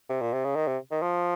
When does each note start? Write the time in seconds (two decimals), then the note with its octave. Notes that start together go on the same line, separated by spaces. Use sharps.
0.09 C3
0.21 A#2
0.33 C3
0.44 C#3
0.56 D#3
0.67 C3
0.91 D#3
1.02 F3